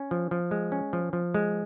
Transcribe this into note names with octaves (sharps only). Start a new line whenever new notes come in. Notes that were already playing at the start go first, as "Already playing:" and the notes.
Already playing: C#4
F3
F3
G#3
C#4
F3
F3
G#3